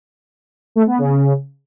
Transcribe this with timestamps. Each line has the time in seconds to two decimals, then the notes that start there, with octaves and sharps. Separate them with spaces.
0.76 A3
0.87 B3
0.98 C#3